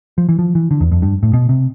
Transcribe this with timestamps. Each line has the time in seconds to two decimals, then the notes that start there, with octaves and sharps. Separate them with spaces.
0.18 F3
0.29 E3
0.39 F3
0.55 E3
0.71 D3
0.81 E2
0.91 F2
1.02 G2
1.23 A2
1.33 B2
1.49 C3